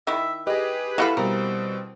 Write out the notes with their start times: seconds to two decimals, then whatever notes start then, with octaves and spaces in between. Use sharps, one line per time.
0.07 D#3 E4 E5
0.47 G4 G#4 B4 D#5
0.98 E3 E4 F#4 A4 F5 B5
1.17 B2 G3 C4 A#4